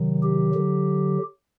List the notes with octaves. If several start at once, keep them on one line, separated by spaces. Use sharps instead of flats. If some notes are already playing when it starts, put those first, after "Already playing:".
Already playing: C3 D#3 F#3
G4
D3 F#3